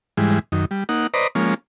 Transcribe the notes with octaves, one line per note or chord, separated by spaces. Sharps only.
G#2 E3 G3 G#3
F#2 D#3
G3
A#3 D#4 F#5
B4 C5 D5 D#5 A#5
F3 G#3 A#3 C#4